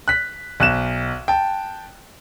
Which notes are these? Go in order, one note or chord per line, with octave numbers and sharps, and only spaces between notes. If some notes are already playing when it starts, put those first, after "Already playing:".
F#6 B6
B1 F#6 E7
G5 A5